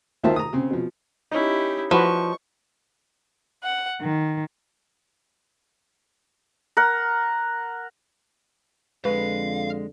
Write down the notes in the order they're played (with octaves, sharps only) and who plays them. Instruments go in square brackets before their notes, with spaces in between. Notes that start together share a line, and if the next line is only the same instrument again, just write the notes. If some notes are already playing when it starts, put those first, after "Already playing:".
[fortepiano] D2 D#3 F4 C5 E5 A5
A#5 D#6
C#3 C4
B2 F3
[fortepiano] C#4 D#4 [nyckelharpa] E4 G4
[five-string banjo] F3 [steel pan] E4 F#4 B4 [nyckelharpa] C#6
[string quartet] F#5
D#3
[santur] A#4 F#5
[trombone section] F2 D3 [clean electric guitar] G#3 [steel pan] B4 [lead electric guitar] F5